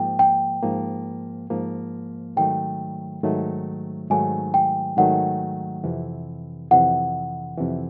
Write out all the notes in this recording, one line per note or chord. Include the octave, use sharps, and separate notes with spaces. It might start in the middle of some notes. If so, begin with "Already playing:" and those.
Already playing: G#2 F3 A#3 G5
G5
G#2 F3 A#3
G#2 F3 A#3
G#2 D#3 F#3 A3 G5
G#2 D#3 F#3 A3
G#2 D#3 F#3 A3 G#5
G5
G#2 D#3 F#3 A3 F#5
F2 C3 E3
F2 C3 E3 F#5
F2 C3 E3